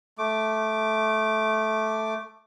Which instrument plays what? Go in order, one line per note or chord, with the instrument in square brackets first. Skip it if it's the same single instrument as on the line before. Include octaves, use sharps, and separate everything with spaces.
[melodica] A3 D6